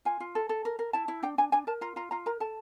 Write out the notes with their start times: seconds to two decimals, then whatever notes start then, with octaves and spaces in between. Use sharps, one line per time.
0.05 F4 G#5
0.20 F4
0.35 A4
0.49 A4
0.65 A#4
0.79 A#4
0.93 E4 A5
1.08 E4
1.23 D4 G5
1.38 D4 G#5
1.52 D4 G#5
1.67 A#4 A5
1.81 F4 A#5
1.96 F4 A#5
2.11 F4 A#5
2.26 A#4 A#5
2.40 A4 A5